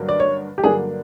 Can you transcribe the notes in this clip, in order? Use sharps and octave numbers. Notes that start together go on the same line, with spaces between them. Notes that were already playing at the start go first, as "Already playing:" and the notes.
Already playing: G2 D3 F#3 A#3 D4
D5
C#5
G4
G2 D3 F#3 A#3 D4 G#4